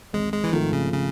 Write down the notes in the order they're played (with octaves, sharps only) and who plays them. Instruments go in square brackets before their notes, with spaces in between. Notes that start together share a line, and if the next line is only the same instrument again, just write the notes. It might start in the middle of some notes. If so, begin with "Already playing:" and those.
[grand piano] G#1 [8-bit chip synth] G#3
[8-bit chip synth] G#3
E3
[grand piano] G#2 F3 A3 [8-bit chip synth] D#3
[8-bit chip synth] C#3
C#3